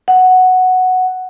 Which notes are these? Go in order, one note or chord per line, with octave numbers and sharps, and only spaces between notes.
F#5